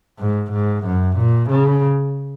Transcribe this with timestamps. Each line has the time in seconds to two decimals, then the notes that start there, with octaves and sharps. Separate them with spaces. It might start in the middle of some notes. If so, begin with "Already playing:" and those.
0.19 G#2
0.52 G#2
0.85 F#2
1.17 A#2
1.50 C#3